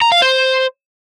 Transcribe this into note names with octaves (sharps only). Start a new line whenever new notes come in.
A#5
F5
C5